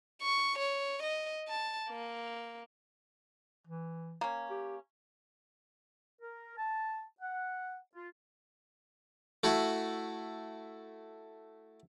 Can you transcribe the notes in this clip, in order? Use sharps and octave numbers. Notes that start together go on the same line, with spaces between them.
C#6
C#5
D#5
A5
A#3
E3
A#3 C#4
G4
A#4
A5
F#5
F4
A3 E4 F#4